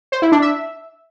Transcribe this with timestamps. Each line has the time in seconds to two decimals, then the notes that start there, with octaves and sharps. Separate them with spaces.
0.12 C5
0.22 E4
0.32 D4
0.42 E5